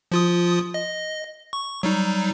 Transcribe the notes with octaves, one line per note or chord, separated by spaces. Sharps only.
F3 F4 D#6
D#5
C#6
F#3 G3 D#4